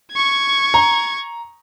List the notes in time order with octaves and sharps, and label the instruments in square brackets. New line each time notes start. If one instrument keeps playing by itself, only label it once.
[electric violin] C#6 G#6
[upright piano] A#5